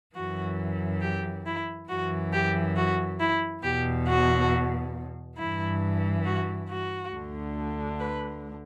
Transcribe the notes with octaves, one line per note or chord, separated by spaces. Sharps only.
F#2 E3 F#4
G4
E4
F#2 E3 F#4
G4
F#4
E4
E2 B2 G4
F#4
G2 E3 E4
F#4
F#4
D2 D3
B4